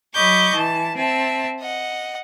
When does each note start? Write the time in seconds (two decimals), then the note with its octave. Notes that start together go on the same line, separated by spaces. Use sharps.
0.13 F#3 D#5 B5 C#6 D6 G6
0.54 E3 A5
0.96 C4 E5 A5
1.61 D#5 F#5